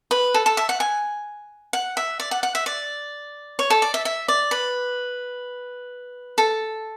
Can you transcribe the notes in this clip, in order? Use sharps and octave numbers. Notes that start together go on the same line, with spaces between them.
B4
A4
A4
E5
F#5
G#5
F#5
E5
D5
F#5
F#5
E5
D5
C#5
A4
D5
E5
E5
D5
B4
A4